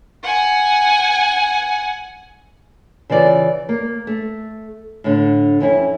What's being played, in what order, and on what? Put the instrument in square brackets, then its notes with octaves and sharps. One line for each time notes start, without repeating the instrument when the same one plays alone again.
[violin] F#5 G#5
[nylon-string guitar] C#3 E3 F4 D5
A#3
A3
A2 D3
F2 C#4 E4